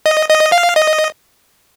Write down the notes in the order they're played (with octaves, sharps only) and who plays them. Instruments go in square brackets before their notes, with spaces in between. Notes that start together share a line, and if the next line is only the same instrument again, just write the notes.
[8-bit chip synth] D#5
D#5
F5
D#5